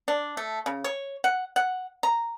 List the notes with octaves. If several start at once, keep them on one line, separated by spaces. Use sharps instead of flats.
D4
A3
C#3
C#5
F#5
F#5
A#5